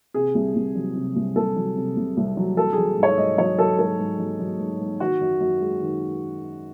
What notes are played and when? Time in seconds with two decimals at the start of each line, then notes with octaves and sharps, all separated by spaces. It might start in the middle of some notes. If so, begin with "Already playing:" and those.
0.14 C3 G#4
0.35 C2
0.55 C2
0.75 F#3
0.95 C3
1.16 C2
1.36 C2 A4
1.56 F#3
1.76 C3
1.96 C2
2.17 C2
2.37 F#3
2.57 F#3 A4
2.73 F#3 G#4
2.98 G#2
3.03 C#5
3.18 G#2 D#5
3.38 F#3 C#5
3.59 F#3 A4
3.79 G#2 A4
3.99 G#2
4.19 F#3
4.40 F#3
4.59 G#2
4.80 G#2
5.00 D#3 F#4
5.21 F#2
5.41 F#2
5.61 G#3
5.81 D#3